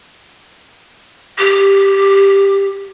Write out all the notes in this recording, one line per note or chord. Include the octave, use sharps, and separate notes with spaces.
G4